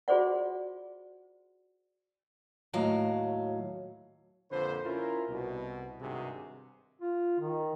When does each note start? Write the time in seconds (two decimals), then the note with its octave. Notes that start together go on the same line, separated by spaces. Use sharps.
0.08 F4 F#4 G#4 C5 D5 F#5
2.73 D#2 A2 F#3 F5
4.51 F2 A#2 D3 B4 C5
4.86 C#4 E4 F4 A#4
5.29 C2 B2
6.00 G#1 G2 C3 D#3 F#4 G#4
7.01 F4
7.40 D#3